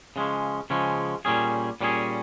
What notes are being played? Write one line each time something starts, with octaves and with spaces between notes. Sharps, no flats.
C#3 F3 G#3 C#4
C#3 F3 G#3 C#4
A#2 G3 C#4 G#4
A#2 G3 C#4 G#4